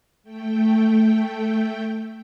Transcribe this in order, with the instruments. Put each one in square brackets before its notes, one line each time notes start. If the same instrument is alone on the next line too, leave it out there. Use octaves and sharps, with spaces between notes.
[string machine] A3 G5